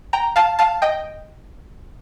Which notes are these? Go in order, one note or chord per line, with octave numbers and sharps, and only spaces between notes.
G5 A#5
F5 A5
F5 A5
D#5 G5